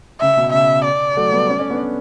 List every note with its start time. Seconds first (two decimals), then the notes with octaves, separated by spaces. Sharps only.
0.21 C#3 E5
0.37 B2
0.53 C#3 E5
0.85 D5
1.17 F#3 A3
1.32 G3 B3
1.49 A3 C#4
1.59 A3 C#4
1.70 B3 D4